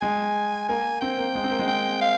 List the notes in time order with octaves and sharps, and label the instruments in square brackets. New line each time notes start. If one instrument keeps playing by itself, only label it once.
[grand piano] G#3 [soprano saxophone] G#5
[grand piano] A#3 [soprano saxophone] G#5
[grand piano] C4 [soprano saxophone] G5
[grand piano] A#3
G#3
C4
A#3
G#3
[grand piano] C4 [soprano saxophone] G5
[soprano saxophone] F5